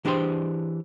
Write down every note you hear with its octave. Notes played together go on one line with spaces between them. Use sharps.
E3 D4 G4 G#4 C5